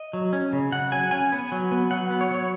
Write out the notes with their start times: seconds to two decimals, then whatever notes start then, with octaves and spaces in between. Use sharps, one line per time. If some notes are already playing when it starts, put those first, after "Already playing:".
Already playing: D#5
0.13 F#3
0.33 C#4
0.53 C#3
0.72 C#3 F#5
0.92 F#3 G#5
1.11 C#4 G#5
1.32 B3
1.52 F#3
1.72 B3
1.91 F#3 F#5
2.11 B3
2.21 C#5
2.31 F#3 C#5